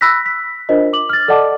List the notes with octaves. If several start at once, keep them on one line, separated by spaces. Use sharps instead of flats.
B5 E6 F#6 A#6 B6
B6
D4 F4 A#4 C5 D#5
D6 F#7
F6 A6
A4 D5 D#5 F#5 A5 D6